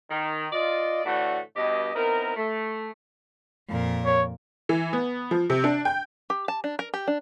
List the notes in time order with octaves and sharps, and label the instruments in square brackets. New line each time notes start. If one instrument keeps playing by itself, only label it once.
[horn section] D#3
F4 D5 D#5
A2 D3 E3 A3 D4 F#4
G2 B2 G4 D#5
B3 C4 D#4 E4 A#4
A3
[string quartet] F2 A#2 A#4
[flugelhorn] C#5
[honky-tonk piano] E3
B3
F3
C3
D4
G5
[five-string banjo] G4
A5
D4
A#4
G4
D4